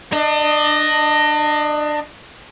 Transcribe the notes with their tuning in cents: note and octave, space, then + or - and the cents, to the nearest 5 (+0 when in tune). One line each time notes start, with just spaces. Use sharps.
D4 +30 D#5 +0